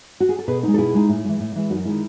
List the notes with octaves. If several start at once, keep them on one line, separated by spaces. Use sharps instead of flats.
F#4
G#4
A4
B2 G#4 B4
G#3 D#4
A4
B2 E4 G#4
G#3 D#4
A2
E3 G#3
A2
E3 G#3
F#2 D#4 F#4
D#3 G#3 E4